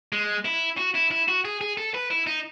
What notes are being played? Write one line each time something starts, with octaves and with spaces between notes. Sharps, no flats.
G#3
E4
F#4
E4
E4
F#4
G#4
G#4
A4
B4
E4
D#4